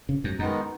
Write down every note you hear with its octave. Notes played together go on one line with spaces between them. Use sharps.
C#3
F#2
F#2 D#3 G#3 B3 D#4